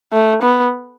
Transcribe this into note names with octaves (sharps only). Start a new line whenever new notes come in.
A3
B3